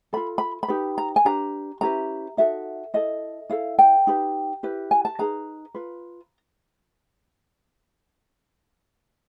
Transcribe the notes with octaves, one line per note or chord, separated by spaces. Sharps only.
F4 A4 B5
B5
B5
D#4 G4 B4
A#5
G#5
D4 G4 B4 A#5
C#4 E4 G4 B4 A#5
D#4 F#4 A4 E5
E4 A4 D#5
E4 A4 F5
G5
D#4 G4 B4
E4 G4 B4
G#5
A5
D#4 G#4 B4 A#5
F4 B4